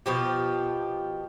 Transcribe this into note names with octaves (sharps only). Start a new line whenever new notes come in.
B2 F3 G4